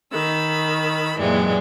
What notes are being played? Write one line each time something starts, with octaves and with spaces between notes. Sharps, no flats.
D#3 B5 E6
F#2 A#2 E3 G3 G#3